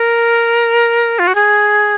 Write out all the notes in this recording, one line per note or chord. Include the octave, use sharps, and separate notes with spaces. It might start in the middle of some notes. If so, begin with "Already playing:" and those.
Already playing: A#4
F4
F#4
G#4